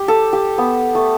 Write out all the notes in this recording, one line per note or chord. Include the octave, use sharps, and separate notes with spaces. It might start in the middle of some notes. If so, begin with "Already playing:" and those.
Already playing: G4
A4
G4
B3
A3